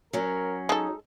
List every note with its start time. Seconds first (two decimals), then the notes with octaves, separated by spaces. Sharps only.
0.13 F#3 C#4 A#4
0.69 G#3 D#4 A4